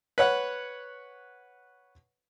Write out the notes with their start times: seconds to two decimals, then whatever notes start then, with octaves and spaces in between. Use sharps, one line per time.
0.18 B4 C#5 F#5